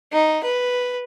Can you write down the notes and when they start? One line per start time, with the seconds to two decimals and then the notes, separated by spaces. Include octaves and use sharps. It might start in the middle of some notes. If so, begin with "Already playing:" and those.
0.12 D#4
0.44 B4